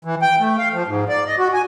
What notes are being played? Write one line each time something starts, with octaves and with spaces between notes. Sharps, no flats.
E3
G5
A3
F5
F3
G#2
D5
D#5
F#4
G#5